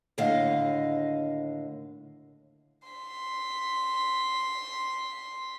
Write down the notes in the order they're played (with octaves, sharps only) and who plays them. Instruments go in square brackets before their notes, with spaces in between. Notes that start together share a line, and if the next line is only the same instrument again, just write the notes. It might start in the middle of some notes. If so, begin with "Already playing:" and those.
[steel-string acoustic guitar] D#2 A2 D3 D#5 F5
[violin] C6 B6